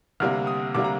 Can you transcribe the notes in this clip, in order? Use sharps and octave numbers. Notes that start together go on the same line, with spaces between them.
D2 C3 G3 A#3 F6
D#6
D2 C3 G3 A#3 D6
A#5